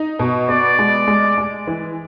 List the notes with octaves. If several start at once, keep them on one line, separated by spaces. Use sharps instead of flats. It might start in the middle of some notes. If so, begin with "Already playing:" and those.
Already playing: D#4
B2
B3 D5
G#3
G#3
G#3
E3